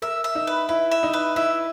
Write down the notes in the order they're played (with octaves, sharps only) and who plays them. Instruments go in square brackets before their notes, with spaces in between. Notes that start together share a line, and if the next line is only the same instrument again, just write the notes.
[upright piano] A#4 [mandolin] E5
[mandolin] E5
[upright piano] D#4
[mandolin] B4
[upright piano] E4 [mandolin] B4
[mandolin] E5
[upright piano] D#4
[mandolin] B4
[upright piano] E4 [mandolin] E5